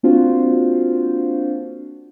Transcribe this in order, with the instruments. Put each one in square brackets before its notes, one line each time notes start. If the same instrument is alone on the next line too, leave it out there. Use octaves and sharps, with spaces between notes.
[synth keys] A#3 C4 D4 F4 F#4 C5